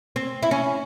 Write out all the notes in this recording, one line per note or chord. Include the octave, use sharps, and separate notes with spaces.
C4
E4
C#4